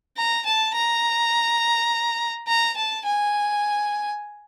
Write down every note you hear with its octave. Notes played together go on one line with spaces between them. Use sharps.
A#5
A5
A#5
A#5
A5
G#5